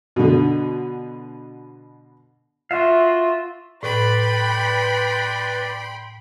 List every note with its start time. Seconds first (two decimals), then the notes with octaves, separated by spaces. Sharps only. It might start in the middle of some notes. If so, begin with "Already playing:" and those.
0.16 B2 D3
2.71 F4 F#4 E5 F5
3.83 A2 B4 D5 G5 B5 C6